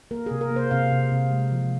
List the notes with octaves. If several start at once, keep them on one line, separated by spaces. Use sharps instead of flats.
A#3 A#4
C3 G#4
A#4
A#3
C5
C3 F5
C3
C3
G#3
F3